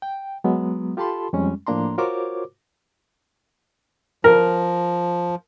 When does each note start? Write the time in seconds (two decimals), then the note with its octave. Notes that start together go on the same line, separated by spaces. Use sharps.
0.02 G5
0.44 F#3 G#3 B3
0.97 F4 G4 A4 A5 B5 C6
1.33 F2 G3 G#3 C#4
1.67 A2 F3 A#3 D4 A#5 C6
1.98 F4 F#4 A#4 C5 C#5 D6
4.24 F3 A#4